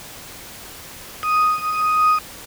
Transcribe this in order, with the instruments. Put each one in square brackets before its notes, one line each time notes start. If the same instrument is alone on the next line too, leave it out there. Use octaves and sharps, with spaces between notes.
[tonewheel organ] D#6